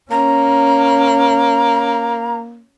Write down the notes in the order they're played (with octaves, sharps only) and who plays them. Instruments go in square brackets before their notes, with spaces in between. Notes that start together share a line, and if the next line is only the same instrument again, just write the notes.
[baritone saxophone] A#3 [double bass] C#4 [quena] A#5